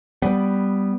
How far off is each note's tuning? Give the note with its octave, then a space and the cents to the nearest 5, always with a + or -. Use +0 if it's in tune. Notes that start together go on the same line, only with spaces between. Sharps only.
G3 -5 B3 +0